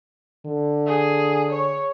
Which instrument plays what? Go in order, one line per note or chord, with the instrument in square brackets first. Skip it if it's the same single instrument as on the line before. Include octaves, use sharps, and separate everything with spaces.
[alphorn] D3
[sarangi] G#4
C#5